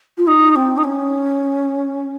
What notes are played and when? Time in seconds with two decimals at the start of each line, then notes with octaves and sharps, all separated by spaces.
0.17 F4
0.27 D#4
0.56 C4
0.77 D#4
0.84 C#4